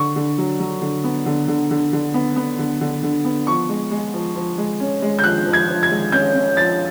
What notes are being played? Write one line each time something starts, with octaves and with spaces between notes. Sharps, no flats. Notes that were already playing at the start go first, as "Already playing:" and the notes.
Already playing: D3 C#6
D3
F#3
F#3
D3
B3
D3
D3
D3
D3
B3
B3
D3
D3
D3
B3
F3 C#6
G#3
G#3
F3
F3
G#3
C#4
G#3
G6
F3 F#6
F3
G#6
F3
G#6
G#3
C#4 G6
C#4
F3 A6